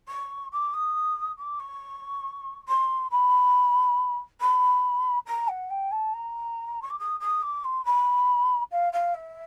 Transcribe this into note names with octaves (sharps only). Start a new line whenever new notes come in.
C#6
D6
D#6
D6
C#6
C6
B5
B5
A#5
F#5
G5
A5
A#5
C#6
D6
D#6
D#6
D6
C6
B5
F5
F5
E5